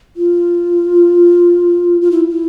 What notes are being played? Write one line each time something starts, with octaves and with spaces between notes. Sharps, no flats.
F4
F4
E4
E4